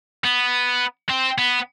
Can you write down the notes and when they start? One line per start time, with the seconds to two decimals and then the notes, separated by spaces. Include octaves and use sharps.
0.25 B3
1.10 C4
1.38 B3